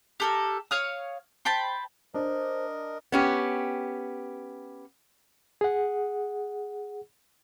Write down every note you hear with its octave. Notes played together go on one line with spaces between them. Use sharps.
G4 A4 A#4
C#5 F5 D#6
C5 G5 A5 B5
D4 A#4 C5 D#5
B3 C#4 G4
G#4 F#5